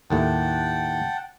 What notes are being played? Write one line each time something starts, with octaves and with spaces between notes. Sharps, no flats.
D#2 A2 A3 F#5 G5 A5